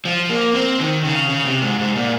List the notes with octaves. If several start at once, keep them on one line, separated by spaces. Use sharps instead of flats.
F3
A#3
C4
D#3
C#3
C#3
C3
G#2
G#2
A#2